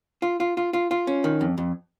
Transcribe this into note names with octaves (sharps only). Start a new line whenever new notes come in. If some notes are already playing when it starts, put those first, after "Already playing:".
F4
F4
F4
F4
F4
C#4
D#3
F2
F2